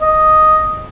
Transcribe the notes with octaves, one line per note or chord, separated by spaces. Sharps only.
D#5